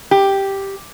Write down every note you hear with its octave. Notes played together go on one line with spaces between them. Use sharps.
G4